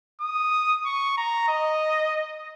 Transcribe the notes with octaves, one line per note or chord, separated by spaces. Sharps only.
D#6
C#6
A#5
D#5